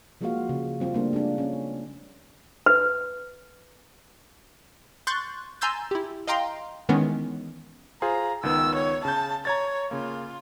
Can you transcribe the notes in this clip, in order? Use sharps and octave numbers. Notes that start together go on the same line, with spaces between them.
F3 G#3 A#3 F4 F#4 F5
C#3
G3 C4 F4
C#3 G3 A3 A#3 C4 D4
G#3 D4
C#4
B4
C6 C#6 F#6 G6 A6
G#5 A#5 C6 E6 G6 A6
E4 G4
D#5 F5 G5 A#5 C6
D#3 E3 G#3 B3 C#4
F4 G#4 C5 A#5
C#2 D#3 B3 E6
C#5
C#3 A5 G6
C#5 A#5 G#6 A6
C#3 A#3 F4